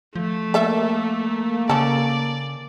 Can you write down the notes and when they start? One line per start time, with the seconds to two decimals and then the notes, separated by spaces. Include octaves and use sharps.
0.15 F3 A3
0.54 A#3 A4 E5
1.69 C#3 C#4 A4 D5